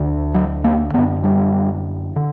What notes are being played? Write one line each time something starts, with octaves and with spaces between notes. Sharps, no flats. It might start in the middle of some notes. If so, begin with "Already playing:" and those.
Already playing: D2 D3
F#3
A#3
F#2 D3 B3
G3
D3